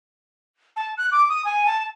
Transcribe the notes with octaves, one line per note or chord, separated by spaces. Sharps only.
A5
F#6
D6
D#6
G#5
A5